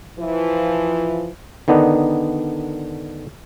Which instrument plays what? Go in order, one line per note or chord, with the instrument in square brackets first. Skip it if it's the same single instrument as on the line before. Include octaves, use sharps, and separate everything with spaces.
[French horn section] E3 F3
[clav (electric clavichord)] D3 D#3 B3 D4 D#4